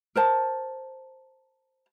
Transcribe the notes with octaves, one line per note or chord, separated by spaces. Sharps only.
A#4 C5 A5